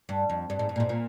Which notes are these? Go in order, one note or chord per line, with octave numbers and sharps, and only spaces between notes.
G2
F2
G2
G#2
G2
A#2
G#2
A#2